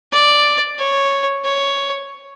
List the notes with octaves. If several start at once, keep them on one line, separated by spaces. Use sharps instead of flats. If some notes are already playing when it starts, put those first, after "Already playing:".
D5
C#5
C#5